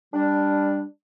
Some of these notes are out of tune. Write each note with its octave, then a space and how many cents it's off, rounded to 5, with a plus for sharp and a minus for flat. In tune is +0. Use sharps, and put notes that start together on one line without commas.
G3 +15 D4 +0